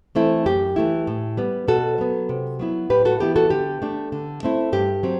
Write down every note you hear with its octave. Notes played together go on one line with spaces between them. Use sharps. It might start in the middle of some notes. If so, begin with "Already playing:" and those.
E3 A3 C4 E4
F#2 G4
E3 A3 E4
A2
G3 B3
B2 F#4 A4
F#3 B3
C3
F#3 B3 E4
A2 G4 B4
F#4 A4
E3 B3 E4 G4
F#4 A4
D3 G4
A3 D4
D3
A3 C4 E4
G2 G4
F#3 C4